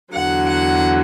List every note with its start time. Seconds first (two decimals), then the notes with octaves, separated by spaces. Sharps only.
0.14 E2 D3 F#3 F#5
0.49 F#5